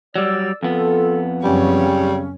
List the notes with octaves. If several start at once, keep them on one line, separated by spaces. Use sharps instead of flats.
F#3 G3 D5 E6
F2 B3 F4 A4
F#2 C#3 G3 C4 C#4 C#5